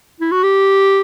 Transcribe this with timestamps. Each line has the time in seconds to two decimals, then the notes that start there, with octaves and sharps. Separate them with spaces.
0.21 E4
0.32 F#4
0.43 G4